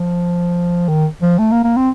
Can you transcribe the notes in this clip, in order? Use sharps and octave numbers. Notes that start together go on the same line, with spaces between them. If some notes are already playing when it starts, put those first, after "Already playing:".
Already playing: F3
D#3
F3
A3
A#3
A#3
C4